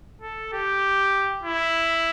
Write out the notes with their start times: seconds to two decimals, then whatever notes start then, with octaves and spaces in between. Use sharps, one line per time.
0.22 A4
0.53 G4
1.43 E4